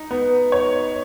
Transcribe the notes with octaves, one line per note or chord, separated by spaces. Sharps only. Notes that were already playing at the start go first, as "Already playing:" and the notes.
Already playing: D#4
B3
C#5